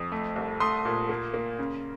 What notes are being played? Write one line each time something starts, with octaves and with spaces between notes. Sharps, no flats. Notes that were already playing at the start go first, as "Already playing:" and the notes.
Already playing: F2 D#6
A3
C2
A3 C6 D#6
A#2
A#3
A#3
C#3